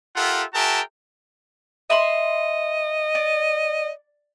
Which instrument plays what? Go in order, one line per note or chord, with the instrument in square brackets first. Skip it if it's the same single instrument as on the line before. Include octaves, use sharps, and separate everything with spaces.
[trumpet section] F4 G4 A4 A#4 E5 F#5
F#4 G#4 A#4 E5 G5 A5
[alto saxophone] D#5 [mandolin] E5 B5 C6
[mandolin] D5